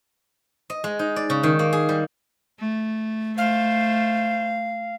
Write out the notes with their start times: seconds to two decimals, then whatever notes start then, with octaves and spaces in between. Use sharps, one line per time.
0.70 D#5
0.84 G#3
0.99 D#4
1.16 D5
1.30 C#3
1.43 D#3
1.59 A#3
1.73 G#4
1.89 G3
2.59 A3
3.38 A3 C5 F5